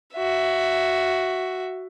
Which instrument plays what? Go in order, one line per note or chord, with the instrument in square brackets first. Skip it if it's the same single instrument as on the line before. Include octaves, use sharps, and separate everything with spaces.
[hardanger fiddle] F#4 E5